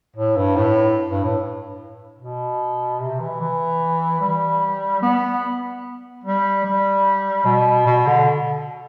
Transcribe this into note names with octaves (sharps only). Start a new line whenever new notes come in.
A2
G2
A2
G2
A2
B2
C3
E3
E3
G3
B3
G3
G3
B2
B2
D3